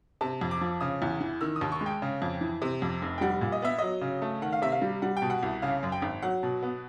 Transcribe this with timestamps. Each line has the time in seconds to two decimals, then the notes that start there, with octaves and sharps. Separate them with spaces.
0.21 C3 A5
0.41 F2
0.51 D6
0.61 F3
0.81 C#3 D#6
1.02 E2
1.21 E3
1.41 D#3 E6
1.56 D#6
1.61 D#2
1.72 C#6
1.81 G#3
1.86 G5
2.02 C#3
2.22 F2
2.41 E3
2.62 C3
2.82 F2
3.02 F1
3.18 G5
3.21 G3 F#5
3.41 A#2
3.52 D#5
3.62 B3 E5
3.78 F#3 D#5
4.01 C#3
4.22 A3
4.42 D#3 F#5
4.53 F5
4.62 C3 E5
4.72 F5
4.82 G3
5.02 G3 F#5
5.17 G5
5.22 B2
5.30 F#5
5.43 C2
5.62 C#3 F5
5.83 F#2
5.92 G5
6.02 G#1
6.22 F#3 F#5
6.43 B2
6.62 B3